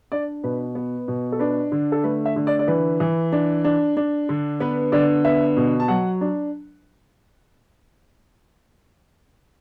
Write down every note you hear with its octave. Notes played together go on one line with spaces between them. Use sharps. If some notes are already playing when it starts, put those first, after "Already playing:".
D4 D5
B2 B4
B3 B4
B2
A4
D4 B4
D3
A4
A3 B4
E5
D3
D5
D5
E3 B4
E3
D4
D4
D4
D3
B3 B4
D3 D5
B3 E5
B2
A5
F#3 F#5
D4